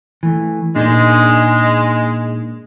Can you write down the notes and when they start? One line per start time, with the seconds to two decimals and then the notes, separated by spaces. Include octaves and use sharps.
0.23 E3 A3
0.76 A#2 G#3 D4 D#4